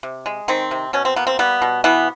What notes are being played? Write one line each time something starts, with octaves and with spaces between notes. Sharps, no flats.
C3
G#3
D#3 C4
C3
B2 C#4
C4
A#3 B3
C4
G3 B3
B2
E3 B3